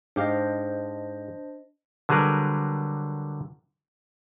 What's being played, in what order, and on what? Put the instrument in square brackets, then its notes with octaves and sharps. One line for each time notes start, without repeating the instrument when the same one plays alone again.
[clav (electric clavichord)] G#2 G4 F5 [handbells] D4 C5 D#5
[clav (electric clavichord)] D3 F#3 G3 G#4 A#4 B4